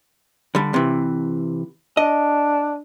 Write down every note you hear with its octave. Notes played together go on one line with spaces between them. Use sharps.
D3 G3
C3 E3
D4 D#5